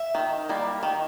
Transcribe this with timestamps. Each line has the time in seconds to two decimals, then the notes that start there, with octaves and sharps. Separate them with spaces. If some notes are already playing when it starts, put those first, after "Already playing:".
Already playing: E5
0.15 D#3
0.49 G3 A#3
0.83 D#3